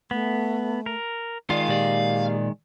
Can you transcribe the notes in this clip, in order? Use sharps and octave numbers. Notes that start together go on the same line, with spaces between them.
A3 B3
A#4
D#3 G#3 F4 D5 F5
A#2 G4 D5